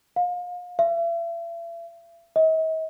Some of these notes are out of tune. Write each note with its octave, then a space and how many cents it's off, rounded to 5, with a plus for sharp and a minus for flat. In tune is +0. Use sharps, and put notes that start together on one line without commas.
F5 +35
E5 +40
D#5 +45